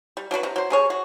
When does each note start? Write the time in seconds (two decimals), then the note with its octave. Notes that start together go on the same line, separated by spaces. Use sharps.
0.17 G3
0.31 F#3 D4 F#4 B4
0.43 C3
0.56 F#3 C5
0.70 C3 G#4 C#5
0.90 F#4